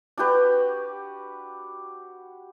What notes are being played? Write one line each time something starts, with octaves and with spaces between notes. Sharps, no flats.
D4 F#4 G4 B4